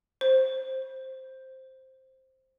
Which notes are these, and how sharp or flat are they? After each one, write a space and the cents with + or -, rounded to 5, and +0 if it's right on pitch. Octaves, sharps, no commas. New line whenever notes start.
C5 +5